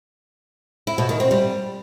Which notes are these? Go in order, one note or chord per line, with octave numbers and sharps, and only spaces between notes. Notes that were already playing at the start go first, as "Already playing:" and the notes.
E4
B2
D#3
C4
G3